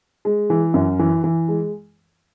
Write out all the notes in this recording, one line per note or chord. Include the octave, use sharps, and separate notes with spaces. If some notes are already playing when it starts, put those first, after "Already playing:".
G#3
E3
F#2
E3
E3
G#3